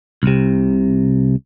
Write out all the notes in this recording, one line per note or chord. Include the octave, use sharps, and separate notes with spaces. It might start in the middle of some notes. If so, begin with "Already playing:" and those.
C2 C3